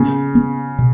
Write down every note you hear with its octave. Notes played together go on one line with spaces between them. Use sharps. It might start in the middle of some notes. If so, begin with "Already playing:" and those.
Already playing: C#3 B3
B3
B2